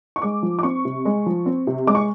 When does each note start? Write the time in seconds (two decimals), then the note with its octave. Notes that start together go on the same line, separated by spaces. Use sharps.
0.16 C#6
0.22 G#3 D6
0.43 F3
0.59 D6
0.63 C4 C#6
0.85 C3
1.05 G#3
1.26 F3
1.46 C4
1.67 C3
1.87 G#3 D6
1.95 C#6